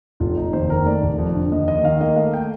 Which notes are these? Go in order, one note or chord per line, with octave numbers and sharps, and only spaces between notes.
F1 F4
F1 D#4
D#2 C5
D#3 A#4
A3 D5
F1
F2
D3
D#2 D#5
D#2 D#5
D#3 F5
A#3 D#5
A3 F5
G5